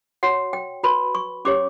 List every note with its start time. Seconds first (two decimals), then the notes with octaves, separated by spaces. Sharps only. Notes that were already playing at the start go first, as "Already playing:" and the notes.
0.23 F#4 C#5 F#5
0.53 G5
0.83 F#4 B4 B5
1.15 C#6
1.45 C#4 G4 C#5 D6